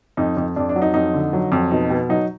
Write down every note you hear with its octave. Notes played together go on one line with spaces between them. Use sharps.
F2 D#4
F2
F2 D4
D4
F#3
D#4
F2 D#4
D3
F#3
F2
B2 D#4
B2
F#3 D#4